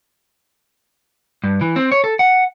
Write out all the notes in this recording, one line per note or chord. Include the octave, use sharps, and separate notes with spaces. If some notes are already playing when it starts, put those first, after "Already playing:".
G2
E3
C4
C#5
A4
F#5